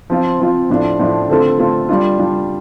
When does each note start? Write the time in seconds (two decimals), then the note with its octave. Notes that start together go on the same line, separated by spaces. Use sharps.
0.10 F3 C4 F4
0.40 F3 C4 F4
0.70 A2 F3 D4 F4
0.99 A2 F3 D4 F4
1.29 D3 A3 C4 F4 A4
1.59 D3 A3 C4 F4 A4
1.89 G3 D4 F4
2.19 G3 D4 F4